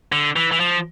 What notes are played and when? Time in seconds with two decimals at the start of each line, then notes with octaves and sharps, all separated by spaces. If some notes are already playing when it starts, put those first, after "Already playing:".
0.12 D3
0.36 E3
0.52 E3
0.60 F3